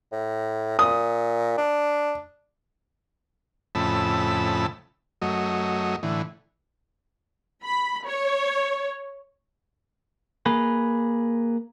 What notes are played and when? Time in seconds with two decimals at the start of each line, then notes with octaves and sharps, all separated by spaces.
0.12 A2
0.79 A#2 D#6
1.58 D4
3.75 F2 A2 C#3 A5 B5 E6
5.22 F#2 F#3 A3 D#5
6.03 A2 D3 E3
7.65 B5
8.06 C#5
10.46 A#3 G#4 B4